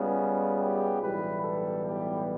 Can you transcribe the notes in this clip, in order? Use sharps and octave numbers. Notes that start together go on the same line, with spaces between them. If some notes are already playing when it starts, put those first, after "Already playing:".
Already playing: C#2 C#3 G3 B3
G4
B1 A2 E3 G3 B3 B4
A4
G4